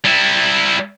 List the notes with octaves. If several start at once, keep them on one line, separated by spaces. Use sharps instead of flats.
G3 E4